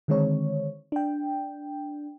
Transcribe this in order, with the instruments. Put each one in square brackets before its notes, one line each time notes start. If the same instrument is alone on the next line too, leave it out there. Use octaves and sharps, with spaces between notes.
[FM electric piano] D3 D#3 G#3 C4 C#5
D4 G5